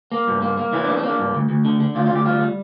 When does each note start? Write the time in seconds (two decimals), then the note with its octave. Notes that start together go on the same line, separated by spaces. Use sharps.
0.12 A#3
0.28 G2
0.42 A#3
0.57 A#3
0.72 E3 E4
0.84 A#3 D4
0.97 C4
1.03 A#3
1.09 D4
1.19 G2
1.35 D2
1.49 D2
1.65 D3
1.80 D3
1.95 D2 F4
2.06 F4
2.11 D2 G4
2.25 G3 F4
2.41 G3